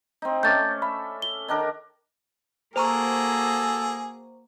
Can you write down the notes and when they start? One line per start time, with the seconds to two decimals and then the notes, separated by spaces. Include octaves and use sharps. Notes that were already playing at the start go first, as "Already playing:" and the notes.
0.22 C4 D#4
0.43 A3 C#4 D5 G6 A6
0.82 E5 B5
1.22 G7
1.48 D#3 D4 A#4
2.76 A#3 F#4 G#4 A4 C5 A#5 C#6